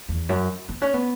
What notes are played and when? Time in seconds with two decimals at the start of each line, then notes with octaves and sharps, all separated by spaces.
0.09 E2
0.29 F#2
0.69 B3
0.82 C#4
0.94 B3